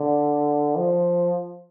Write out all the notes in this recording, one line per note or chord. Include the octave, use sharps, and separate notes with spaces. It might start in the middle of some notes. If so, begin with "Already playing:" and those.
Already playing: D3
F3